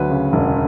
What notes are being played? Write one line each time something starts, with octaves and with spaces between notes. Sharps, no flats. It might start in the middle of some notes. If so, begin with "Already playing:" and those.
Already playing: D2 F#3 B4
C#3
E1